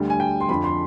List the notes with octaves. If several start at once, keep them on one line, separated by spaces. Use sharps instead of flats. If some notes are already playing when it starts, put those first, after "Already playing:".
Already playing: D2 D3 G3
G#5
G5
C6
F2 D3 F3 B5
C6